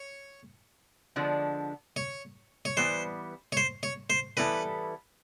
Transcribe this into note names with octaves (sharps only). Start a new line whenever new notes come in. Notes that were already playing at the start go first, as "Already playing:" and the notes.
Already playing: C#5
D3 F3 G#3 B3 D4
C#5
C#5
E3 G3 B3 C5
C#5
C5
C#5
C5
E3 G3 B3 E4 A4 B4